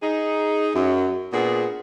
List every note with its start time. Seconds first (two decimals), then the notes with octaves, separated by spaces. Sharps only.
0.02 D#4 G#4
0.75 F#2 F#3
1.33 A#2 B3 D4 G#4